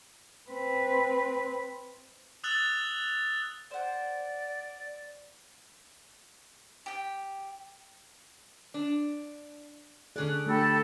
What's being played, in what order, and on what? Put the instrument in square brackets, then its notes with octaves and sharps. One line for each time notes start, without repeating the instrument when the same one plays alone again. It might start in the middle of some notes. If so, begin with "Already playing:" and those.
[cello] C4 B4
[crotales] D#6 E6 F#6 A6 F7
[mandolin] C5 F#5 [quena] D5
[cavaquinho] G4 G5
[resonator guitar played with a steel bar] D4
[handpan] D3 A4 [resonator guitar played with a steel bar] C#4 G#4 D5 [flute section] F#6
[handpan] A3 D4 [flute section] G4 B5 E6 [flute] A4